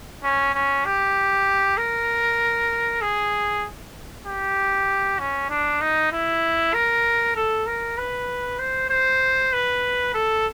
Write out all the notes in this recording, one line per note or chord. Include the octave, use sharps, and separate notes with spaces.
C#4
C#4
G4
A#4
G#4
G4
C#4
D4
D#4
E4
A#4
A4
A#4
B4
C5
C5
B4
A4